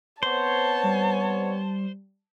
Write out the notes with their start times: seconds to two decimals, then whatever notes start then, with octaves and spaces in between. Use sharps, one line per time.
0.23 B3 C4 C5 C#5 A5
0.84 G3